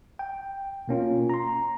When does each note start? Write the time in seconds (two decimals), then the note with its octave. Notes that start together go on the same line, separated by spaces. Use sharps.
0.19 G5
0.88 B2 A#3 C#4 F4
1.30 A#5 C6